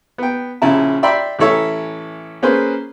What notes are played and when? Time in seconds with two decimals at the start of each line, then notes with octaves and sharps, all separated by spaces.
0.18 B3 G5
0.62 A#1 C#3 C#4 E4 A5
1.03 D5 E5 G5 B5 C6
1.39 A1 E3 A4 C#5 E5
2.42 A#3 C#4 G#4 B4 C5